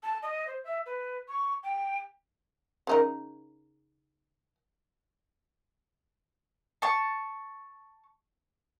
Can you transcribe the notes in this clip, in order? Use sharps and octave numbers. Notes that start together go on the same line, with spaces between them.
A5
D#5
C5
E5
B4
C#6
G5
C#3 D#4 A#4
A5 C#6